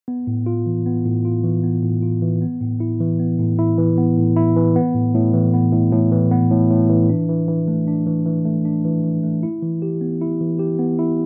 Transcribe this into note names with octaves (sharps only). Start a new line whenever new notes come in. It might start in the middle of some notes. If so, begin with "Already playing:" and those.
B3
A2
F4
E3
B3
A2
F4
E3
B3
A2
F4
E3
B3
A2
E4
E3
B3
A2
E4
E3
B3
A2
E4
E3
B3
A2
A2
E3
B3
A2
A2
E3
B3
A2
A2
E3
D4
E3
E3
A3
D4
E3
E3
A3
D4
E3
E3
A3
E4
E3
G4
B3
E4
E3
G4
B3
E4